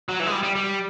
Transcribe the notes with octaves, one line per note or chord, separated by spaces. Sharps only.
F#3
E3
G#3
G3
G3
G3